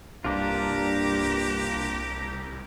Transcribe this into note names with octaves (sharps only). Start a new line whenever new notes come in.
C2 G2 A#3 D4 F4 G4 A#5